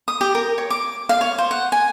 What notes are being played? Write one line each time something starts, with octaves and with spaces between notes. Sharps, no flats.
D#6
G4
A#4
C#5
D6
F5
C#5
C5
F#5
G#5